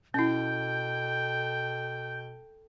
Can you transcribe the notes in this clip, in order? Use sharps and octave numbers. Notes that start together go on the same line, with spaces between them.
B2 C#4 E4 A4 G5 G6